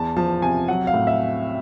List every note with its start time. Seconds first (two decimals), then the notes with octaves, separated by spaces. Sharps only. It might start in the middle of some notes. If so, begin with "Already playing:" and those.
Already playing: E2 A5
0.17 F3 A5
0.42 C3 G#5
0.68 F#3 F#5
0.87 F5
0.94 A2
1.07 E5